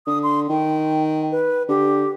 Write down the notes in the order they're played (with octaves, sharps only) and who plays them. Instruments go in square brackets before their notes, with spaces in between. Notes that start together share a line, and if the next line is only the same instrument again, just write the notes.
[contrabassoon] D3 [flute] D#6
[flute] C6
[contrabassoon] D#3 [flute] G5
[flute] B4
[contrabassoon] D3 [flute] G4